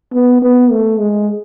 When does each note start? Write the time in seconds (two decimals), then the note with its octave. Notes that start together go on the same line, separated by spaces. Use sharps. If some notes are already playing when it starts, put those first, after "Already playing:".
0.13 B3
0.42 B3
0.71 A3
0.99 G#3